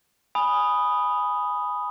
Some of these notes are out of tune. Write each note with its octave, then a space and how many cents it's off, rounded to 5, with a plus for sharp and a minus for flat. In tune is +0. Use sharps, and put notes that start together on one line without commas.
G#5 -5 B5 +0 D#6 +0